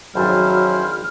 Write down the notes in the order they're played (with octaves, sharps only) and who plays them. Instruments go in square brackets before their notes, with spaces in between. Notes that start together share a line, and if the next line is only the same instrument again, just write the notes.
[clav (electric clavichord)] G#1 F2 D5 [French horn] F#3 [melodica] C#4 E4 C5 [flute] F6